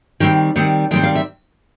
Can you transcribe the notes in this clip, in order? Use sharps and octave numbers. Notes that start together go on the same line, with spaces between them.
D#3 G3 C4 G5
D#3 G3 C4 F#5
D#3 G3 C4 G5
F5
E5